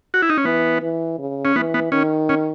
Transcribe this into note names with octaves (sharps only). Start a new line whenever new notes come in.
F#4
E4
D#4
C#4
E3 B3
E3
C#3
C#4
E3 B3
B3
D#3 C#4
C#4